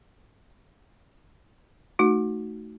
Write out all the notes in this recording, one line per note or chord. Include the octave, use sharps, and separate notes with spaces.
A3 D#4 F#4